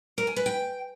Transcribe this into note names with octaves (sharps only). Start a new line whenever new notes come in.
A#4
G#5
B4
G5